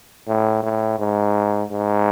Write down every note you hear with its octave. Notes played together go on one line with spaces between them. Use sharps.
A2
A2
G#2
G#2